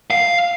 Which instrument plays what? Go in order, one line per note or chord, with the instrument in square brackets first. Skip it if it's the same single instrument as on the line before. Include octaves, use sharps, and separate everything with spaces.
[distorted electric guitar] F5